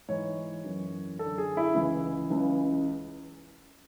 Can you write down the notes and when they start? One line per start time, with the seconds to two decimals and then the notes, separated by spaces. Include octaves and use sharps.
0.09 G#2 E3 C#5
0.64 F#2 E3
1.19 F#2 D3 A4
1.38 G#4
1.57 E4
1.75 C#2 C#3 E3
2.30 C#2 C#3 E3